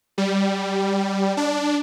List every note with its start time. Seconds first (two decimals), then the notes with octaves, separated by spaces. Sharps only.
0.18 G3
1.37 D4